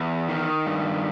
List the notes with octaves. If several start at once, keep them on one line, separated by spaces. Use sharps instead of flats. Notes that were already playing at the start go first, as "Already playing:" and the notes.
Already playing: E2
D#3
G2